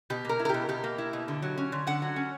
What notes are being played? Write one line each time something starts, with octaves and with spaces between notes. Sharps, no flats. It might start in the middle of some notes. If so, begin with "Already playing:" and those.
B2 G4
A#3 A#4
E4
A#4
B2 G4
B2 G4
A#3
E4
B2
D3
F#3
C#4
D3
D3 F#5
F#3
C#4